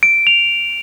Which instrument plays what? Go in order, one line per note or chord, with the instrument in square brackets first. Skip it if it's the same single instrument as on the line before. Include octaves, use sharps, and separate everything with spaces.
[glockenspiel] D7
F7